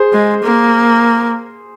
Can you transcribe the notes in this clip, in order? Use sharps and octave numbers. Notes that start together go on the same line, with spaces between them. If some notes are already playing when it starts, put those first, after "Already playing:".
Already playing: G#4 C5
G#3
A#3